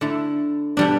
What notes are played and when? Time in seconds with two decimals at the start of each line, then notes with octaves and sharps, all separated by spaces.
0.01 D3 A3 E4
0.77 B2 G3 D4